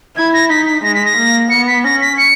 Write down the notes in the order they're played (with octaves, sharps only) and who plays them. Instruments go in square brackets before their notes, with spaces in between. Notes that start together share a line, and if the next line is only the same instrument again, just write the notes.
[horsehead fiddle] E4 [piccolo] G#6
[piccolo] A#6
[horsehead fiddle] D#4 [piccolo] B6
[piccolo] B6
[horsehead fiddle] G#3 [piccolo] A#6
[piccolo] B6
A#6
[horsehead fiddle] A#3
[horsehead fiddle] B3 [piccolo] C#7
[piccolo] B6
[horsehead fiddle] C#4 [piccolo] A#6
[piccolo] B6
C#7